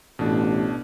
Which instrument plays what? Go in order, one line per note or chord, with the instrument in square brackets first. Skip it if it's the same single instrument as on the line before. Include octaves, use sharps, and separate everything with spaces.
[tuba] A1 [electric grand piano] B2 D4